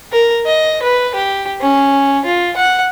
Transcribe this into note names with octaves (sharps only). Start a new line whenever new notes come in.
A#4
D#5
B4
G4
C#4
F4
F#5